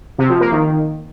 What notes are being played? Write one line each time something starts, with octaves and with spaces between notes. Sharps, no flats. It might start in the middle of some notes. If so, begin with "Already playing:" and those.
C3
F3
A#3
D#3